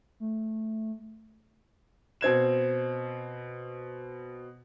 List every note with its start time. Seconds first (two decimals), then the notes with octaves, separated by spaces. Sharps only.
0.20 A3
2.21 B2 C4 G#6 E7